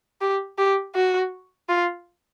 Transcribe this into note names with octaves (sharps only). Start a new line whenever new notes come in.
G4
G4
F#4
F4